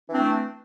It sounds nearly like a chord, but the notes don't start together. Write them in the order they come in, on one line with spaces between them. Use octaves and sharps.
E3 D4 C4 A3